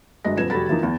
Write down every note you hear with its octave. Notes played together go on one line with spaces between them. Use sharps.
G1 G#3 F#4 D#5 A#6
D#1 F2 B4 G#6 E7
F1 F#4 G4 A4 B5 A6
E3 F3 A#3 D#4
E2